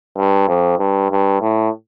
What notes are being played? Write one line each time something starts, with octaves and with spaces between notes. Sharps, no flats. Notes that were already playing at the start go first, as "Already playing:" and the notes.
G2
F2
G2
G2
A2